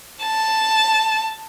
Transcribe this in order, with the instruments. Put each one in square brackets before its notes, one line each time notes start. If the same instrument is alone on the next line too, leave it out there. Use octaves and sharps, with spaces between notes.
[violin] A5